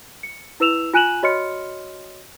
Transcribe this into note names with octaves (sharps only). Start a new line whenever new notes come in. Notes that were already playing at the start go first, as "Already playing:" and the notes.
C#7
E4 B4 E6 E7 F7
F4 G#5 F#6 D#7 E7 F#7
F#4 C#5 D#5 C6 F6 C#7